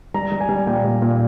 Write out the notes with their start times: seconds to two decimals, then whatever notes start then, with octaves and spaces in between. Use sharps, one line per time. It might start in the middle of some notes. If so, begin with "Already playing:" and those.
0.14 G3 A#5
0.32 G3
0.41 G#5
0.49 G3
0.67 A#2 G5
0.84 G3
1.02 A#2